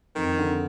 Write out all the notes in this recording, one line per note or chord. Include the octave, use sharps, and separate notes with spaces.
F2 D#3
D3